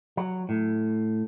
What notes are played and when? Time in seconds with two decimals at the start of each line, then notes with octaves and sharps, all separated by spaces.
0.17 F#3
0.49 A2